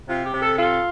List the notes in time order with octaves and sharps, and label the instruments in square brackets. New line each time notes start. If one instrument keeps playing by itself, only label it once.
[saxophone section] C3 F4
G4
C3
A4
F4 A4